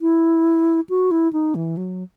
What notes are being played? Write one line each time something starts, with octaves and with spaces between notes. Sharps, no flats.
E4
F#4
E4
D#4
E3
F#3